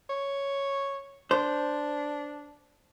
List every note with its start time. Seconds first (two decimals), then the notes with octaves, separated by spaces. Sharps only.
0.10 C#5
1.31 D4 C5